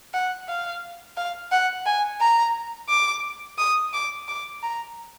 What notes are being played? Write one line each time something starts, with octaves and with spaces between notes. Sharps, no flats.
F#5
F5
F5
F#5
G#5
A#5
D6
D#6
D6
D6
A#5